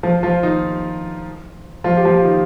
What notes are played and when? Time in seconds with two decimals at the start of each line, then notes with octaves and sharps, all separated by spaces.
0.03 F3 F4
0.23 F3 F4
0.43 D#3 D#4
1.84 F3 F4
1.97 G4
2.05 F3 F4
2.24 D#3 D#4